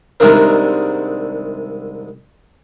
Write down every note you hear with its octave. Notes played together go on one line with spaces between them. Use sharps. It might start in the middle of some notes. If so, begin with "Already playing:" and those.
C2 C3 D#3 G#3 D4 A#4